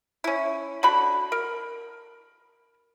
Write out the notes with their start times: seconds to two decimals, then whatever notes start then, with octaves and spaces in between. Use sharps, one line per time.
0.24 C#4 E4
0.83 D3 F#4 B5
1.32 A#4